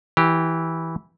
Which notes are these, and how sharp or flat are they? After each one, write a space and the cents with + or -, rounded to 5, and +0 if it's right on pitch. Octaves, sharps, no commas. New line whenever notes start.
E3 -10 G4 +0